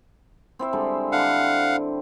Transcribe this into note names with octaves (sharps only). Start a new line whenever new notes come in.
C4 E4 E5
D3 G3 G#3
D3 F5 F#5